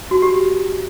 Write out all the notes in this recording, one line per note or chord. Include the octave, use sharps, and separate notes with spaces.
F#4
G4